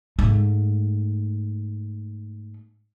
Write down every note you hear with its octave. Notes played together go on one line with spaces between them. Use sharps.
G#2 A3